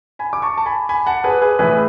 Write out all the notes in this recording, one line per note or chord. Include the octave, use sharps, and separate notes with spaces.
G#5 B5
D6
A5 C#6
A5
G#5 B5
G#5 B5
F#5 A5
G#4 B4
G#4 B4
A2 E3 G#4 B4